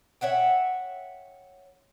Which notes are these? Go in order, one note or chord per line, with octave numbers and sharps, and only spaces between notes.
C#5 E5 F#5 G5